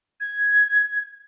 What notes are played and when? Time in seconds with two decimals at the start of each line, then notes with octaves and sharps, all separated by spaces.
0.20 G#6